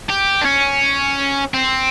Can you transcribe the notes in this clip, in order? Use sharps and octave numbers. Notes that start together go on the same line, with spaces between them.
G4
D4
C#4
C4